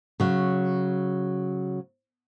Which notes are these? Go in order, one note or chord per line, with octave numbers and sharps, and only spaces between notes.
C#3 F#3